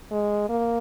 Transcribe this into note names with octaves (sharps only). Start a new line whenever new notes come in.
G#3
A#3